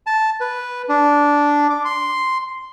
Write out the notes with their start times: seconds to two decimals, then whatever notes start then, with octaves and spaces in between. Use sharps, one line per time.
0.06 A5
0.40 B4
0.89 D4
1.70 D6
1.85 C6